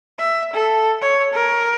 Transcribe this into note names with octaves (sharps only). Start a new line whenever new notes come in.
E5
A4
C#5
A#4